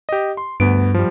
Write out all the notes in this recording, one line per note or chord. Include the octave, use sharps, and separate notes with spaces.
G4 D#5
C6
D2 G2 B3 D7
F3 G3